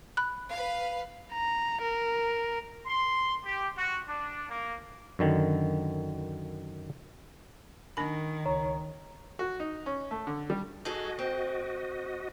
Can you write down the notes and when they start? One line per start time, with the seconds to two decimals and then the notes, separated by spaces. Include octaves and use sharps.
0.17 B5 F#6
0.51 B4 F5
1.33 A#5
1.82 A#4
2.87 C6
3.45 G4
3.78 F#4
4.08 D4
4.50 A#3
5.19 F#2 D3 D#3
7.97 D#3 D4 A#4 B5
8.46 C#2 C#5 A#5
9.39 F#4
9.60 D#4
9.86 C#4
10.11 A3
10.27 D3
10.50 G3
10.85 D#4 F#4 G#4 A4 D#5
11.19 C4